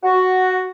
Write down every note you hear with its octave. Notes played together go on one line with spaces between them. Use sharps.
F#4